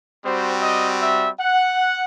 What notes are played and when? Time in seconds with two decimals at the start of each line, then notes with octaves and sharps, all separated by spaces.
0.24 G3 C4 F#4 C5
0.63 D#5
1.01 E5
1.39 F#5